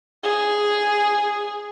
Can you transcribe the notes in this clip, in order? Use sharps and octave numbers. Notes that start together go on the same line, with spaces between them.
G#4